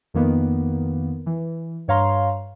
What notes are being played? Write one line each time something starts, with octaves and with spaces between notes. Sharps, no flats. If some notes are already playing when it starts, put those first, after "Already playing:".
F2 D#3 A#3 B3
E3
G2 C#5 F5 A#5 C6